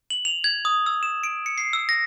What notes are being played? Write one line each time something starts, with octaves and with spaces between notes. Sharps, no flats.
F#7
F7
G#6
D#6
E6
E7
D7
C#7
C7
E6
A#6